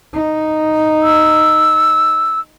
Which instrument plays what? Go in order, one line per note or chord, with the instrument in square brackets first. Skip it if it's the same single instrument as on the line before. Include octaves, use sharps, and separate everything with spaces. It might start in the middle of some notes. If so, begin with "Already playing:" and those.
[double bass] D#4
[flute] E6